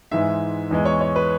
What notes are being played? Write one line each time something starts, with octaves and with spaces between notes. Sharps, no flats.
G#2 E3 G#3 E5
E2 E3 G#3
C#5
C#5
B4